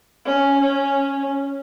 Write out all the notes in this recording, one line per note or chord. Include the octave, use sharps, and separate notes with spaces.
C#4
C#4